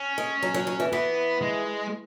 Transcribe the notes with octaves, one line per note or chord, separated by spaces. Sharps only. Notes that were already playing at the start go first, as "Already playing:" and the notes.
Already playing: C#4
G#3
F#3
F#3
F#3
E3
E3 B3
G#3